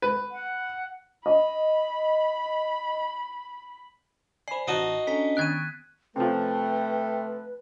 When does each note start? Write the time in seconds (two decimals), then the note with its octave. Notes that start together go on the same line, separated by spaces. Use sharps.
0.02 B4
0.32 F#5
1.26 D#5 B5
4.48 C5 D5 G#5 B5 C7
4.68 A1 D#4 F#4 A5
5.07 C#4 D4 A4 A#5 B6
5.37 D#3 B3 F#6 G#6 D7 D#7
6.16 C3 F3 A3 B4 G5